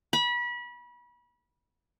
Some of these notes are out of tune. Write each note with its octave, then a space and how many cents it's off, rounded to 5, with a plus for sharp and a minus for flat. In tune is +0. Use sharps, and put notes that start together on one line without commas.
B5 -30